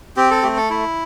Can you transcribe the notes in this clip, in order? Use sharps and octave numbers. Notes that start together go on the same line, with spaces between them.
C4 G4
A4
A3 G4
A4
E4